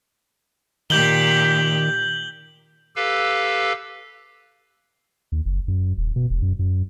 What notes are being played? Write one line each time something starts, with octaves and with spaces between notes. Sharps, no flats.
A#2 D#3 G4 G6 F#7 G7
G4 A4 B4 F5 E6
D#2
F#1
F#2
D#1
B2
E1
F#2
F#2